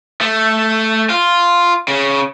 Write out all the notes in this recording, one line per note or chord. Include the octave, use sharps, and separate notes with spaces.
A3
F4
C#3